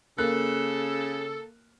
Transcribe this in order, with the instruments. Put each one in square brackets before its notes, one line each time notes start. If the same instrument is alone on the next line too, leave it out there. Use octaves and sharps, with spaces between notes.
[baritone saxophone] C#3 [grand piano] A#3 F#6 [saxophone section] A4